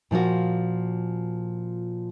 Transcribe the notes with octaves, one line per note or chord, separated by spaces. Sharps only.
A#2 F3 F4 F#4